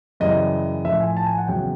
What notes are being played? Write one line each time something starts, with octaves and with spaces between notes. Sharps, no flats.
F#2 C#3 E3 G3 D#5
A2 F3 E5
G#5
A5
G#5
F#5
E2 C#3 F#3 G5